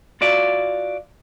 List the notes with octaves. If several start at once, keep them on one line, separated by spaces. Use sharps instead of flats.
F4 F#4 D5 E5 F5